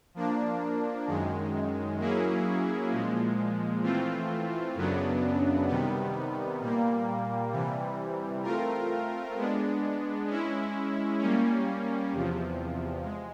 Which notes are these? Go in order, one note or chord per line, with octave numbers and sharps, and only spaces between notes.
F3 A#3 D4
F#2 D#3 G#3
F#3 A#3 C#4 E4 G#4
A#2 F3 G#3
E3 A3 C4 F4
F#2 C#3 F#3 B3 D4
C3 D#3 G3 B3
A#2 G3 A#3
C3 E3 G3
A3 C4 F4 A#4
G#3 B3 D4
G#3 C#4 E4
G3 A#3 C#4
E2 C3 F3
G#3